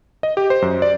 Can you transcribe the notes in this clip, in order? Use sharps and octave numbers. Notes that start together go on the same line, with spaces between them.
D#5
G4
C5
F#2
D5